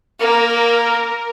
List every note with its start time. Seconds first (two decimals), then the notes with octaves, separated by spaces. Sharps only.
0.20 A#3 A#4